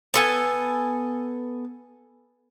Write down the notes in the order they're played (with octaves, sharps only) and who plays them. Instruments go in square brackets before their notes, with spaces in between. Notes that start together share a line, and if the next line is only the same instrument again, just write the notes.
[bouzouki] B3 A4 G#5